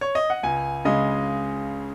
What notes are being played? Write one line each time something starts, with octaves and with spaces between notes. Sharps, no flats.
C#5
D#5
F#5
C#2 G#5
C#3 G#3 D#5